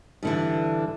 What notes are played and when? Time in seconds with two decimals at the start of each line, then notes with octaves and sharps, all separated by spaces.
0.23 G2 D3 E3